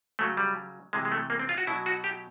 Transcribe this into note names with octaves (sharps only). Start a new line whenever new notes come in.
C#3 F#3 A3
G3
C3 E3 G#3
G#3
A3
A#3
C4
F4
F#4
B2 F#3 E4
F#4
G4